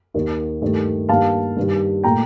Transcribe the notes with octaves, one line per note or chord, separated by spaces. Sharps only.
D#2 D#3 A#3
G2 D#3 A3
G2 D#3 A#3 F5 A5
G2 D#3 G3
A#2 A3 G5 A#5